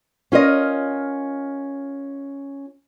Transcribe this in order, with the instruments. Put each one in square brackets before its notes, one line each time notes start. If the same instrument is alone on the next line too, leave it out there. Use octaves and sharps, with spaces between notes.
[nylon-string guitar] C#4 F4 A#4 D#5